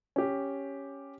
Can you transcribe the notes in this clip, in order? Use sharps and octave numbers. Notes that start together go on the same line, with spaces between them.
C#4 G4